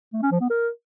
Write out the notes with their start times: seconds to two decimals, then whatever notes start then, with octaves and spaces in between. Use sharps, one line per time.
0.13 A3
0.22 C#4
0.31 F3
0.41 B3
0.50 A#4